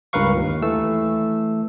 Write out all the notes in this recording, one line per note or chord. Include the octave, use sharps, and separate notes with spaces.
C#2 G2 A#4 B4 F5 C#6
D#2
E3 A3 E6